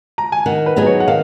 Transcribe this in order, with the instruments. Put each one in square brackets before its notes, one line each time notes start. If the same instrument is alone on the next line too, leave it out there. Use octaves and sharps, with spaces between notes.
[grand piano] A#5
G#5
[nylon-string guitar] D#3 [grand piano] F#5
[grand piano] B4
[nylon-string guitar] F#3 B3 D#4 G#4
[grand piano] C#5
F#5
[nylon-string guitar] D#3 [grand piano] F5